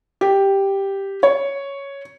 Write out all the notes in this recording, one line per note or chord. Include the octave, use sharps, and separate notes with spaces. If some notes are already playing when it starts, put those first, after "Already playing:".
G4
C#5